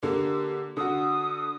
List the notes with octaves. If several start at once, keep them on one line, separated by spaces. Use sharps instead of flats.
D3 A#3 G4
D3 F#4 D#6